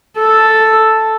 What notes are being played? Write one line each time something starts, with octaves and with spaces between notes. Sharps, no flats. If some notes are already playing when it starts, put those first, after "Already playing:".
A4